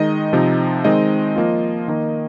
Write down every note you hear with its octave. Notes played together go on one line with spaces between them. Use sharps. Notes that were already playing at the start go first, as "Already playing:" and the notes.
Already playing: D#3 G#3 D#4 D#5
C3 F3 C4 D#4
D#3 G#3 C4 D#4 D#5
F3 A#3 F4
D#3 A#3 D#4